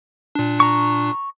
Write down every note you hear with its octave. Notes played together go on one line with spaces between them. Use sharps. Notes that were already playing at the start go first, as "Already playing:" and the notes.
A#2 D4
A#5 C#6